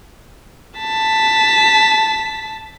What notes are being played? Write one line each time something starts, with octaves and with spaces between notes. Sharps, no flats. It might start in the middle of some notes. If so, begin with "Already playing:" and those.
A5 B6